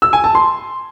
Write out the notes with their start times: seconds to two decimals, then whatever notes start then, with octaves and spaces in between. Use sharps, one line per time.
0.02 E6
0.13 G#5
0.24 A5
0.35 C6